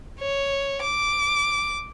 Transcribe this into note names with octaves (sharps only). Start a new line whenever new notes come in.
C#5
D6